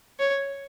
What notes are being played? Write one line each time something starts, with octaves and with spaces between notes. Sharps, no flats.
C#5